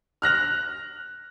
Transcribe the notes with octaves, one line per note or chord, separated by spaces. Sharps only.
F6 F#6 A#6 F7